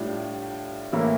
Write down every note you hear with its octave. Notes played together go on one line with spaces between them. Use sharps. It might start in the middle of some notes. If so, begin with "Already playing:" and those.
Already playing: A2 G3 D4 F4
A2 E3 A#3 E4